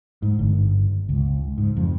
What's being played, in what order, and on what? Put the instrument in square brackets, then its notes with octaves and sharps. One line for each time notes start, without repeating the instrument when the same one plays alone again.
[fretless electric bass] G#2
G1
C#2
G#2
F2